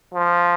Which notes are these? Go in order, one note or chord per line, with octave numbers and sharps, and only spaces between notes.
F3